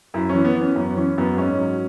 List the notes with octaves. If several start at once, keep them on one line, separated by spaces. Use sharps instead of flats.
F#2 E4
E3 C#4
B3
E3
C#4
F#2 B3
E3 C#4
F#2 B3
G#2 C#4
F#3